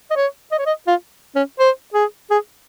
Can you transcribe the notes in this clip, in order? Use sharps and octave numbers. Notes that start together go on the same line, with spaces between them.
D#5
C#5
D#5
C#5
D#5
F4
C#4
C5
G#4
G#4